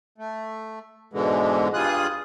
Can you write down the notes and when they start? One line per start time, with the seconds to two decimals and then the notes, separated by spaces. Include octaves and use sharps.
0.18 A3
1.13 G#2 B2 D3 E3 G#3
1.74 G2 G3 F4 G#4 D#6 F#6